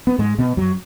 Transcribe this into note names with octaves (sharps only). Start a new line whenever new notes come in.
B3
G#2 G#3
B2 B3
F#2 F#3